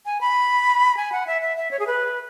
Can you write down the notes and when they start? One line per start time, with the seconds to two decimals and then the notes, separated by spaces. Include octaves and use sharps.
0.06 G#5
0.21 B5
0.97 G#5
1.12 F#5
1.27 E5
1.42 E5
1.57 E5
1.71 C#5
1.79 G#4
1.87 B4